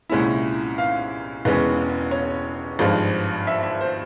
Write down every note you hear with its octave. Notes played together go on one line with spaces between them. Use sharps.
C2 A#2 G#3 C#4 E4
F5
E1 E2 E3 G#3 C#4
C#5
G#1 G2 F3 G#3
E5
E5
C5